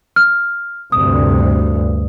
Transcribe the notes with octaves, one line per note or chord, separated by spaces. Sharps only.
F6
D2 G2 C3 D#6